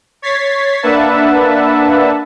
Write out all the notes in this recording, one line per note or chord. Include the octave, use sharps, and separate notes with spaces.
C#5 G#6 A6 B6 C7
A#3 D4 B4 E5 F#5 A5